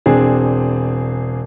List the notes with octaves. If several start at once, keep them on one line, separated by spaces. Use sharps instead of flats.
E1 C4 D4 G#4